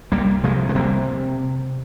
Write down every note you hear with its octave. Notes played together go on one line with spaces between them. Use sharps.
C2 G3 A#3
C3 F3 G#3
G#3
C3 G3 A#3